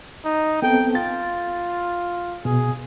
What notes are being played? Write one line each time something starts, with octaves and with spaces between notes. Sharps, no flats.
D#4
B3 C4 A4 G5
F4 A6
B2 G#4